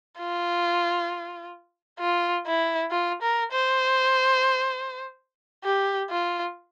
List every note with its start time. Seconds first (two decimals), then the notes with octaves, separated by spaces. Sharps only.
0.19 F4
2.00 F4
2.47 E4
2.91 F4
3.22 A#4
3.52 C5
5.64 G4
6.10 F4